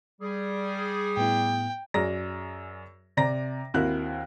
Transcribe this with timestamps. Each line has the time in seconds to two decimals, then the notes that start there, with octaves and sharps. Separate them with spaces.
0.21 G3 G#4
1.17 A2 B3 E4 G5
1.94 F#2 G#4 D5 A#5 A#6
3.17 C3 D5 A#5 A#6
3.74 D#2 C4 E4 F#4 A#4 F#6